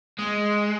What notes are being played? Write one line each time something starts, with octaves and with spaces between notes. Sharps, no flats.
G#3